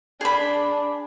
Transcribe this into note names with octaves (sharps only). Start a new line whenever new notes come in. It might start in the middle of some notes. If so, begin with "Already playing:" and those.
D4 G#4 B5